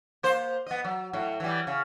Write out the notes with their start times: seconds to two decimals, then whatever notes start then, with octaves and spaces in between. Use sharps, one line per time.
0.23 A#3 C5
0.67 B3 D#5
0.84 F#3
1.13 A2 F#3
1.40 E3 G3
1.67 C#3